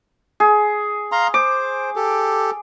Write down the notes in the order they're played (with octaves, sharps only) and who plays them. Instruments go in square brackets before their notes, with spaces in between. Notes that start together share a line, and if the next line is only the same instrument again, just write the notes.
[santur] G#4
[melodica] F5 A#5 C6
[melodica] C5 [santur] D6
[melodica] G4 A4